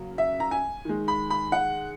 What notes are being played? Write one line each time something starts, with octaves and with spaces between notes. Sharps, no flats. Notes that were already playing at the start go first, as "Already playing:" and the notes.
Already playing: C#3 F#3 A#3
E5
A#5
G#5
D#3 G#3
B5
B5
F#5